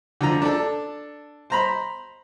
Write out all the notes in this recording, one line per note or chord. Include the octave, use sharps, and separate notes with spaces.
D3 F3 A#5
D4 A4
C5 A#5 B5